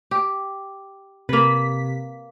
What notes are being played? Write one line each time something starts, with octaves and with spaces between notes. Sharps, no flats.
G4
C3 A#3 B4 B6